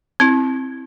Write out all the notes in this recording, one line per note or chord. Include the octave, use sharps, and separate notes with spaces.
C4 E4